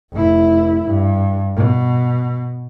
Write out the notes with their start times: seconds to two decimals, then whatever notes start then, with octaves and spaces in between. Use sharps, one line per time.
0.13 F1 E4
0.87 G2
1.56 B2